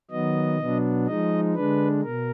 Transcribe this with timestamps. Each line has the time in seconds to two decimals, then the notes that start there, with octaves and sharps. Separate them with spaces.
0.11 D#3 F#3 B3 D#5
0.59 B2 F#3 B3 D4
1.07 F3 G#3 D#4 D#5
1.55 D3 G#3 D4 B4
2.03 B2 A#4